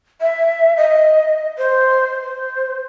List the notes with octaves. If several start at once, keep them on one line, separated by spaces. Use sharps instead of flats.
E5
D#5
C5
C5